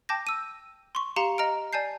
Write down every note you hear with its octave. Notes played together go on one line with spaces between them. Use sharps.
G5 A5 D6 G6 A#6
E6 D#7
C6 C#6
G4 F5 A#5 C6 C#7 E7
D#5 A#5 F6 D7
D5 G#5 A5 G6 C7